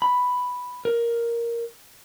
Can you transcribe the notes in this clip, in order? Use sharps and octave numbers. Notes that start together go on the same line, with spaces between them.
B5
A#4